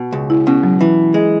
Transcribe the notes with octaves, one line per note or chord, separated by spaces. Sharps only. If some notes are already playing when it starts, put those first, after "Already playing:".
Already playing: B2
C#2
E4
B2 C#4
F#3
E3
G#3